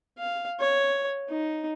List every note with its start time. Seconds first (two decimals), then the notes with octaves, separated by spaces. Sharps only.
0.18 F5
0.60 C#5
1.29 D#4